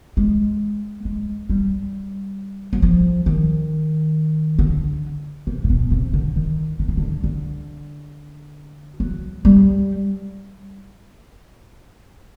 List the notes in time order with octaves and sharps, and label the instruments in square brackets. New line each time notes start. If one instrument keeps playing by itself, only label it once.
[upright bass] G#3
G#3
G3
F#3
F3
D#3
D3
C3
A#2
B2
C3
D3
D#3
D3
C#3
D3
D3
F#3
G3